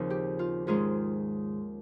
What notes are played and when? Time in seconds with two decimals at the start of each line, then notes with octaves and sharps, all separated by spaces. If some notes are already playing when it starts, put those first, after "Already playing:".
Already playing: D#2 C#3 F3 C4 D#4
0.10 G4
0.39 F4
0.67 G#2 D#3 G#3 C#4 F4 G#4